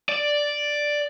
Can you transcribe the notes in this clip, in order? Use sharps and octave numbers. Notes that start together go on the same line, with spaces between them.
D5